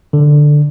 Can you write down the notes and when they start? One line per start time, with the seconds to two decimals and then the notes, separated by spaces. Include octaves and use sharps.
0.13 D3